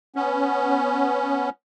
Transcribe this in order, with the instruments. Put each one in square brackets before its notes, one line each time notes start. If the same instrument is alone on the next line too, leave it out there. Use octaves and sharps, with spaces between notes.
[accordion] B3 C#4